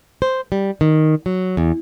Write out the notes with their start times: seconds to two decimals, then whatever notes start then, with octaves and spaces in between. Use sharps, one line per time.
0.22 C5
0.52 G3
0.81 D#3
1.26 F#3
1.57 E2